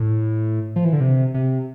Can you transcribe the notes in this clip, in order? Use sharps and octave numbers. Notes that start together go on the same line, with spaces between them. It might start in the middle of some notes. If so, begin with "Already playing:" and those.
Already playing: A2
F3
E3
D3
C3
C3